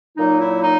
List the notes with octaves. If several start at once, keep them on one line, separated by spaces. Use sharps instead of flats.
A#2 F#3 A#3 D#4
E4
D#4